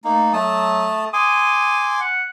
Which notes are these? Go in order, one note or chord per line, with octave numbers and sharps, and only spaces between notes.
A3 A#3 D#4
F#3 A3 A5 D#6
G#5 C6 D6 D#6
F#5